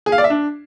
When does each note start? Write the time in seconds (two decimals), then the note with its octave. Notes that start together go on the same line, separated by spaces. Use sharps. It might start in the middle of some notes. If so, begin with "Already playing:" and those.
0.06 G#4
0.12 F5
0.18 D5
0.24 E5
0.30 D4